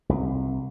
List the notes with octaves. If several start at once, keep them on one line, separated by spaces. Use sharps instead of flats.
C2